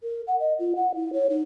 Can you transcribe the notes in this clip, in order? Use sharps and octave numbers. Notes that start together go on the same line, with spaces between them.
A#4
F#5
D#5
F4
F#5
E4
C#5
D#4